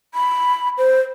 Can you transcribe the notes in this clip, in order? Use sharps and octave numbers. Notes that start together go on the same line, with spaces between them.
B5
C5